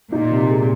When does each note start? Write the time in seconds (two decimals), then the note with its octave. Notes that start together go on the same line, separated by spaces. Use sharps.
0.12 A#2 D#4
0.31 C3
0.50 G#3